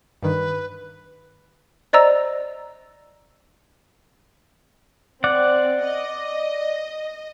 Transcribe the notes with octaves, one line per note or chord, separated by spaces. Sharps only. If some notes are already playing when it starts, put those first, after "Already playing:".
G2 D#3 B4
C5 D5 D#5 A#5 E6
C4 D5 F#5
D#5